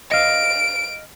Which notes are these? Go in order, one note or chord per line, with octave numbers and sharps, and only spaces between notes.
D#5 F5 D7